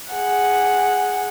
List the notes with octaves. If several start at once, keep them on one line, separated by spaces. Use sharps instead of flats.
G#4 F#5